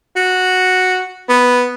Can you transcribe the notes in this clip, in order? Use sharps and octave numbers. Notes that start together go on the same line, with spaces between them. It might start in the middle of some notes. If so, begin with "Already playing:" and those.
F#4
B3